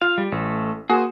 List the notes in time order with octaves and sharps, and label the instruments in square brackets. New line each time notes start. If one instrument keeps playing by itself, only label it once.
[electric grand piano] F4 [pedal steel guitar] F5
[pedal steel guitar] G3
[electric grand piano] A1 [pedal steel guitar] A3
[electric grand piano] A#3 F#4 [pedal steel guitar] G#4 C5